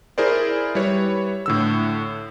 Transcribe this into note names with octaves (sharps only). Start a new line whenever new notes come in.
E4 G#4 A#4 C5 D5
G3 E4 B4 C#5
A2 D3 E6